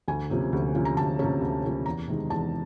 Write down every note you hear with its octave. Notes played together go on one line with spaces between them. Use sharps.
D2 G#5
C3 F3 A#3 C#4
D2
C3 F3 A#3 C#4
A#5
D2 A5
C3 F3 A#3 C#4
D2
C3 F3 A#3 C#4
E2 A#5
C3 D#3 G#3
E2 A5